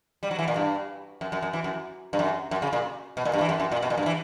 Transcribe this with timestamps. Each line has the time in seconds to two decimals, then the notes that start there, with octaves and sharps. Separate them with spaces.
0.23 G3
0.31 F#3
0.39 E3
0.48 A#2
0.56 G2
1.21 F#2
1.32 F#2
1.42 F#2
1.53 E3
1.64 F#2
2.13 G2
2.19 F#2
2.51 F#2
2.62 C#3
2.73 A#2
3.17 B2
3.25 A#2
3.33 G2
3.41 E3
3.49 F#2
3.60 F#2
3.72 A#2
3.82 B2
3.90 A#2
3.98 G2
4.06 E3